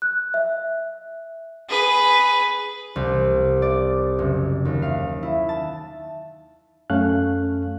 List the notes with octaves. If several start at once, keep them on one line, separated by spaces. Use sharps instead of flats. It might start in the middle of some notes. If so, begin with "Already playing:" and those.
F#6
E5
G#4 B4
C2
D5
F#1
D#2
F5
E4
A5
F#2 A3 C#4 A4 F5 F#6